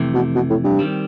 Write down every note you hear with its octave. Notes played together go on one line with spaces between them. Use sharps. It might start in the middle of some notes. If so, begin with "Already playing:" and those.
Already playing: F2 C3 E3 A3
B2
B2
A2
G2
D#3 G3 C4